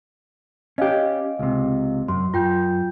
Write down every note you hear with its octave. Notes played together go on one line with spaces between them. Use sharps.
C#4 G4 D#5 F5
C#2 C3
F#2 C6
F#2 F4 G5 G6